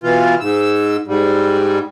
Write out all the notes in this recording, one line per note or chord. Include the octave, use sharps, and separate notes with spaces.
B2 E3 F4
G#2 E6
G#2 G3